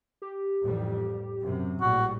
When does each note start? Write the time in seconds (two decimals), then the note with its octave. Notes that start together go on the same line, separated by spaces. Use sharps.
0.22 G4
0.62 A1 F2 G3
1.41 F#2 C3
1.81 A#1 A2 G3 F#4